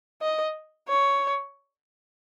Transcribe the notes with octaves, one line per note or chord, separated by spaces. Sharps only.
D#5
C#5